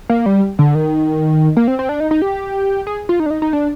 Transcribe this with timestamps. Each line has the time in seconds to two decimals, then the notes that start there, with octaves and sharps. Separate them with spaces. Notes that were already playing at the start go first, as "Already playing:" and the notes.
0.09 A#3
0.26 G3
0.59 D3
0.75 D#3
1.57 A#3
1.68 C4
1.79 C4
1.89 D4
2.00 D#4
2.11 D#4
2.22 G4
2.87 G#4
3.09 F4
3.20 D#4
3.26 D4
3.31 D#4
3.42 D#4
3.53 D4